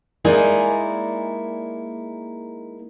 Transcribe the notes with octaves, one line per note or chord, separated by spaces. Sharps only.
G#3 A#3 D#4 E4 D5 G#5